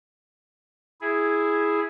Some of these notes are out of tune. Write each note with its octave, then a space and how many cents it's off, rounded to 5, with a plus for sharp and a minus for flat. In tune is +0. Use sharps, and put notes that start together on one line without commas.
E4 +0 G#4 +0